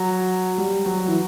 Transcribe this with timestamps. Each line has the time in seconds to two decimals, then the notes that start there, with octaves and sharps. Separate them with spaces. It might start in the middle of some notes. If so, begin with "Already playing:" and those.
Already playing: F#3
0.58 G3
0.86 F#3
1.07 E3